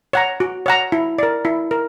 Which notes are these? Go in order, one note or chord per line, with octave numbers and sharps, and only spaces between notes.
C#5 F#5 A#5
F#4
C#5 F#5 A#5
E4
A#4 D5
E4
A#4